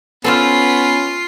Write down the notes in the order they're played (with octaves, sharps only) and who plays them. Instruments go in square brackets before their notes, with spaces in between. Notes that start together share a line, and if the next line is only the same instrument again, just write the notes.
[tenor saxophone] B3 [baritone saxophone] C#4 [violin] F4 C7 [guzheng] A4 C5 F5